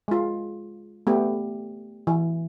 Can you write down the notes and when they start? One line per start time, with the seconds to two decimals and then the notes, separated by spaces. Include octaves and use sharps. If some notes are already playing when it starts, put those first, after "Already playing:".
0.08 G#3 F4
1.07 A3 B3 G4
2.07 E3